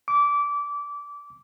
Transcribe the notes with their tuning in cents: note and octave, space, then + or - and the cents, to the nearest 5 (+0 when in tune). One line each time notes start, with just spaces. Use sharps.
D6 -20